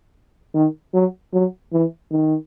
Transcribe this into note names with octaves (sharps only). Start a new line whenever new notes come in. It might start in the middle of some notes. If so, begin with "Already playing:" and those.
D#3
F#3
F#3
E3
D#3